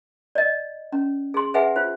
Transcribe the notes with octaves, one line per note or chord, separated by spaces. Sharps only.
D5 D#5
C#4
G#4 C6
G#4 B4 E5 F#5 G#5
F4 C5